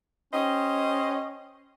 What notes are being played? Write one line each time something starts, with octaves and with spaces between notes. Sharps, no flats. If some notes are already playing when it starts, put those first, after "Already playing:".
C#4 G4 C5 D#5